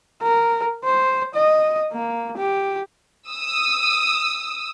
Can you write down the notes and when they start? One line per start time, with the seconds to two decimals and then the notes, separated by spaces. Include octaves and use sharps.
0.22 A#4
0.85 C5
1.34 D#5
1.93 A#3
2.37 G4
3.28 D#6 E6